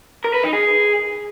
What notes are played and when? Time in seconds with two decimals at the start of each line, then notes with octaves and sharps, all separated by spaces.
0.24 A#4
0.34 B4
0.44 D#4
0.53 G#4